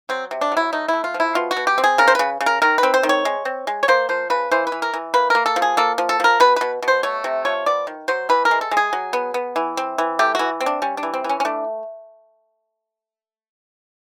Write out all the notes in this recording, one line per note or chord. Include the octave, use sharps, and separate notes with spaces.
F#3 C4
C3
D4
F#3
E4
A3 D#4
A3 E4
F4
F3
E4
B2 F4
F#4
B2
G4
C4
G#4
C#3 A#4
C5
C#3 B4
C#3
A#4
D#3 A#4
B4
C4
C5
D#3
C#5
G#3
C4
G#3
C#5
A#3 C5
F3 C5
C#3 B4
E3 C5
B4
E3
A#4
E3
A#3 B4
A#3 A#4
A4
F3
G#4
A#3 A4
F3
A4
F3 A#4
B2 B4
B2 B4
B2
C5
A3 C#5
C3
F3 C#5
B3 D5
D#3
F#3 C5
E3 B4
A#4
G#3
A4
G#3
G#4
F#3
B3
B3
E3
C4
E3
A3 G4
E3 F#4
C4
D4
G3 C#4
D4
E3
C4
E3 C#4
C#4
A3 D4